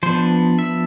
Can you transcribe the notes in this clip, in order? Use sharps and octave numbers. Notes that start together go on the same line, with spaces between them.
F3 B3 D4 C5
E5